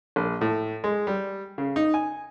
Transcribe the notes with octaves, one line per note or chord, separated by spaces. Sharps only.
A#1
A2
G#3
G3
C#3
D#4
G#5